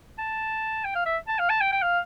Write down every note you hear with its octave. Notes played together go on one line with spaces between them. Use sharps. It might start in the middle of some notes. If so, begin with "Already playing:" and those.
A5
G5
F5
E5
A5
F5
A5
G5
G5
F5